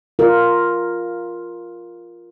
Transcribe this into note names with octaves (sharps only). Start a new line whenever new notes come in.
F4 A#4